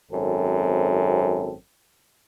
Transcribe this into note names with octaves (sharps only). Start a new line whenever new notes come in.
G#1 F#2 C4 A4